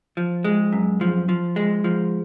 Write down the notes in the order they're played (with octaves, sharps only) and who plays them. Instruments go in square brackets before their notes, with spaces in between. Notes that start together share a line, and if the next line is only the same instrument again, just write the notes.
[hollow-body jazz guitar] F3
G#3
F#2
F3
F3
G#3
F3